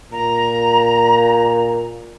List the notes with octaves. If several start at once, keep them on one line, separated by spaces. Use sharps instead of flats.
A#2 A#5